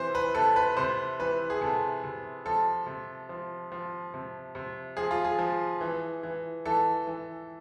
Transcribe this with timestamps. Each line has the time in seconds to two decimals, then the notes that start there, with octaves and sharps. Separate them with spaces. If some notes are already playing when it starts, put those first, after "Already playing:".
Already playing: C3 E3 C5
0.15 B4
0.35 C3 A4
0.56 B4
0.77 C3 C5
1.19 E3 B4
1.50 G#4
1.61 C3 A4
2.04 C3
2.46 F3 A4
2.87 C3
3.29 F3
3.72 F3
4.14 C3
4.55 C3
4.97 F3 G#4
5.11 F4
5.24 G#4
5.39 F3
5.81 E3
6.23 E3
6.65 E3 A4
7.07 E3